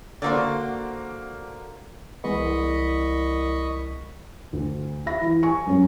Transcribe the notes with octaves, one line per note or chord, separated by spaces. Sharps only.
D3 A#3 F#4 C5 D5
C2 E3 G#3 B3 D#5 B5 C#6
D2
E5 B5 A#6
E3
G#5 C#6
F#2 C#4